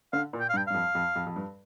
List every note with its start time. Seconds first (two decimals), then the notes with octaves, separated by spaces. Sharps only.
0.13 D3 F5
0.33 A#2
0.40 G5
0.49 F5
0.54 G2
0.57 G5
0.67 G2 F5
0.74 F2
0.95 F2
1.16 F2
1.27 F2
1.36 G2